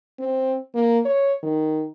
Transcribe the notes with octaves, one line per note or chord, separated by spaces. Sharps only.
C4
A#3
C#5
D#3